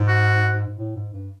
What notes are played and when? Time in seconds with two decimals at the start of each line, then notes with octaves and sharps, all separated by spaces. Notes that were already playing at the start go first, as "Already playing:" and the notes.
Already playing: G#2
0.08 F#4
0.67 G#2
0.78 A2
0.96 G#2
1.14 G2